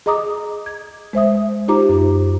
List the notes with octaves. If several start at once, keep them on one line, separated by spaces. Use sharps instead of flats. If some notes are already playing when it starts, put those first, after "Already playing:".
G#4 D#5 A#5 D6 D#6
G#6
G#3 C5 E5 D#6
D#4 F4 G4 C5 A#5 D6
F#2